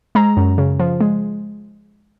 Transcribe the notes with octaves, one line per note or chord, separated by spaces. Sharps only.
G#3 A#5
F#2
C#3
F3
G#3